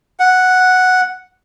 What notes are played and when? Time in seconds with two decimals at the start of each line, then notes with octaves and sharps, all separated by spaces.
0.19 F#5